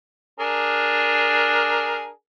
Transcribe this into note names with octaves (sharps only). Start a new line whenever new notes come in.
D4 G#4 A#4